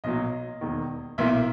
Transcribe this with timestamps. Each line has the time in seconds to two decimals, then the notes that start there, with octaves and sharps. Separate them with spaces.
0.04 B1 A#2 F#3 D#5
0.61 E1 D#2 D#3
1.18 B1 A#2 A#3 E4 E5